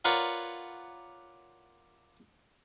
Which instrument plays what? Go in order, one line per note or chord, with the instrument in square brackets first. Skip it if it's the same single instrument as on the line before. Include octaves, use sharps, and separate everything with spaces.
[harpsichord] F4 A#4 B4 C#5 D5 F#5